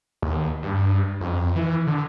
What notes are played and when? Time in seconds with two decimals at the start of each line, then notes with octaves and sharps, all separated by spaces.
0.22 D#2
0.63 G2
1.21 F2
1.56 E3
1.87 D3